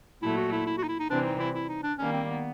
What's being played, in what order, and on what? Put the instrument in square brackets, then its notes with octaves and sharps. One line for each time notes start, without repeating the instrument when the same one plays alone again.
[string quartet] A#2 F#3 A3 [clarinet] E4
[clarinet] F#4
E4
E4
F#4
D#4
E4
D#4
[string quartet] C3 E3 G3 C4 [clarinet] D4
[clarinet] D#4
E4
E4
D#4
D4
[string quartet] D#3 G3 A#3 [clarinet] C#4
[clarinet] C4
B3